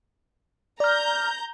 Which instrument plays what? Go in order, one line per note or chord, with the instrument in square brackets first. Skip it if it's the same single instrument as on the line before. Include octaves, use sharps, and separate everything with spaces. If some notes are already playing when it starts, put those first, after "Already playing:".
[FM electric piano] D5 F6 [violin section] A#5 G6